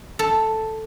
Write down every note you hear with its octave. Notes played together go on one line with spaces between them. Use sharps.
A4